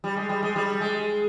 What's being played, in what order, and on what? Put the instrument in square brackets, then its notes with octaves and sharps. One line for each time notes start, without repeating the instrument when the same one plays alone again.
[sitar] G3
G#3
G3
G#3
G3
G#3